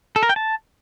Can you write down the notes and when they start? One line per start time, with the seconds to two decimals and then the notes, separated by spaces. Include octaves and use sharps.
0.16 A4
0.23 A#4
0.29 G5
0.36 A5